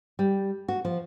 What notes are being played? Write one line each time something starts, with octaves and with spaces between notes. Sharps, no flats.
G3
F#4
F3